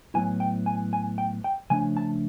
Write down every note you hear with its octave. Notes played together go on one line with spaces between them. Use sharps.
A2 F#3 B3 E4 G#5
G5
G#5
G#5
G5
G5
C#3 F3 A3 D4 G#5
A5